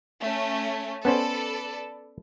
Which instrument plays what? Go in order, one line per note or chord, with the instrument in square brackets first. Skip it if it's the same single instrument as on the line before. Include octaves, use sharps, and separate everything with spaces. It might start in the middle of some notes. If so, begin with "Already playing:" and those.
[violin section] A3 C#4
[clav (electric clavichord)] B3 C#4 C5 [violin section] A4 B4 D5